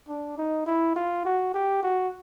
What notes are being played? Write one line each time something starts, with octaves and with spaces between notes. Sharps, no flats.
D4
D#4
E4
F4
F#4
G4
F#4